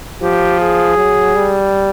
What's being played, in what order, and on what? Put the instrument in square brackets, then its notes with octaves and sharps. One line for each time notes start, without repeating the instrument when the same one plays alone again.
[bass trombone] F3 [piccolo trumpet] G4
[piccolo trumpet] G#4
[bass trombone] F#3
G3